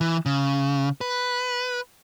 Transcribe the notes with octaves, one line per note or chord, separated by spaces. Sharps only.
E3
C#3
B4